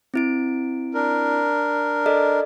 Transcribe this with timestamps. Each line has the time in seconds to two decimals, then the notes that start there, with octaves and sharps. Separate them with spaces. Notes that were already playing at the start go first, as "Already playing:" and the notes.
0.14 C4 E4 D7
0.94 D4 A#4
2.06 A4 D5 D#5